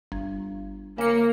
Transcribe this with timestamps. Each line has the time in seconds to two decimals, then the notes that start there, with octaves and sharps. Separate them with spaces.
0.12 G1
0.98 C#3 A#3 C#7